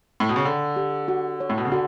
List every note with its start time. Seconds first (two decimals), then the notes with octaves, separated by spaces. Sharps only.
0.20 A2
0.29 B2
0.36 C#3
0.44 D3 G5
0.76 G4
1.08 F#4
1.40 C#5
1.50 A2
1.58 B2
1.65 C#3
1.72 D3 F#4